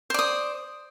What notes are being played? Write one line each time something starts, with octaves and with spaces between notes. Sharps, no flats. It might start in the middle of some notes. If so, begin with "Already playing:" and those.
C5 D5 D#6